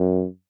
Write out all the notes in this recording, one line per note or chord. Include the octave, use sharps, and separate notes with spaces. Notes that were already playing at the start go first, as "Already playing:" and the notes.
Already playing: F#2